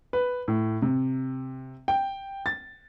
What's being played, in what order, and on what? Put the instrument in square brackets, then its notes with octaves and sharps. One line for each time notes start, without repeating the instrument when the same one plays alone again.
[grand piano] B4
A2
C3
G5
A6